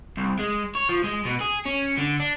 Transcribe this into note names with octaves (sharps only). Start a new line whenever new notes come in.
C2
G#3
C#5
F3
G#3
B2
G#4
C#4
D3
D4